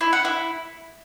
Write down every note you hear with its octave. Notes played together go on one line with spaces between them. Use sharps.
E4
F#5
E4